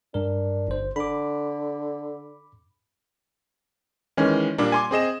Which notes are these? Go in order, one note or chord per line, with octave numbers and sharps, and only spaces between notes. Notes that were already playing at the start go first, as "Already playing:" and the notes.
G2 D4 A#4
G1 C5
D3 B5 D6
D#3 E3 G#3 C#4
A#2 G3 A#3 D4
G#5 C6 D6
C4 G#4 D#5 E7